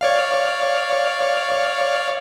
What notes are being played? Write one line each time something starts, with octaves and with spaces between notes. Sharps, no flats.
C#5 D5 F5